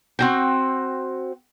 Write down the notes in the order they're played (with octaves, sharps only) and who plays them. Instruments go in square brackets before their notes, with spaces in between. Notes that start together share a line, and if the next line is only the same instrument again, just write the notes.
[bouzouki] C4 F#4 G5